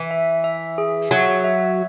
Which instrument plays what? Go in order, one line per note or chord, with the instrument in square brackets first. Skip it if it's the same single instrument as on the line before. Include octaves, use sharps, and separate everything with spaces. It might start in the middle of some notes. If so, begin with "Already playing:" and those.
Already playing: [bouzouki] E3
[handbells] E5
E5
G#4
[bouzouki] F#3 [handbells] E5
[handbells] E5